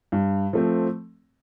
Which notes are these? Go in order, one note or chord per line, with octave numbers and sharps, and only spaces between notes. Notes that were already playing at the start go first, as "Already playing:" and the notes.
G2
F3 A3 C4